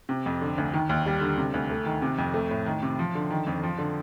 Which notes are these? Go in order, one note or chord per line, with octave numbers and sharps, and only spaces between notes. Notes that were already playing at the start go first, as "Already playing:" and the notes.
C3
F2
D3
D2
D#3
D#2
G3
D3
C3
D2
A3
D#3
C3
F2
A3
A2
D#3
C3
F3
D3
D#3
F2
F3
D3